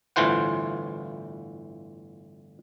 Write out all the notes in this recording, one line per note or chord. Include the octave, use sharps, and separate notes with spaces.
G1 A2 E3 F4 C5 F#5